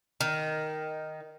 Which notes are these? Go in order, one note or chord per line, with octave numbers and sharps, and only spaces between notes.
D#3